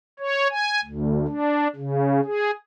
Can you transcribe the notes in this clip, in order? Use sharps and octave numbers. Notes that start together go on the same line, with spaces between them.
C#5
G#5
D2
D4
C#3
G#4